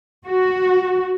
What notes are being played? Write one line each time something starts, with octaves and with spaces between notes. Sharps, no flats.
F#4